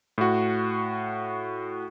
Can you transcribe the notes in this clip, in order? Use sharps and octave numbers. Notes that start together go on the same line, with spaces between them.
A2 F#4